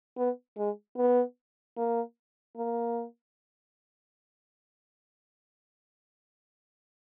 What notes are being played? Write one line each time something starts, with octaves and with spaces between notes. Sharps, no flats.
B3
G#3
B3
A#3
A#3